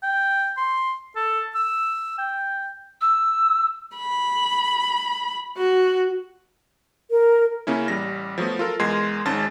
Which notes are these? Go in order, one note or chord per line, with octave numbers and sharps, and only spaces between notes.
G5
C6
A4
E6
G5
E6
B5
F#4
A#4
C#3 A#3 C#4 E4
A1 G3 A#6
F3 F#3 A3 B3
F4 A4 A#4
E2 G#3 A#4 C6 G#6 C7
G#1 G#2 C#4 A5 A6